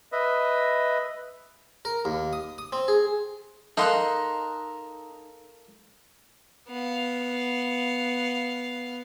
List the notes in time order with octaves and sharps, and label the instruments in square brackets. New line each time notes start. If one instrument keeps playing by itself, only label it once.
[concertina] B4 D#5 E5
[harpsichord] A#4
D#2
D#6
D#6
C4
G#4
[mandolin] D#4 C6 F#6 [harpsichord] A4 A#4 F5
[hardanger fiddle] B3 F5